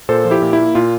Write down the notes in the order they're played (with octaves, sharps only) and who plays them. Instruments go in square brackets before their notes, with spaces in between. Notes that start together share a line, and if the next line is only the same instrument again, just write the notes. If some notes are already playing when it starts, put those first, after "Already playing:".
[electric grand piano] A#2 A4 C5
F3
E4 G4
A#2
E4
A#3
A#2 F4